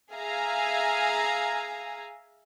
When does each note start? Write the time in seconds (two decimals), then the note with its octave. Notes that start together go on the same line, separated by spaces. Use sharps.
0.10 G#4 E5 F5 G#5 A#5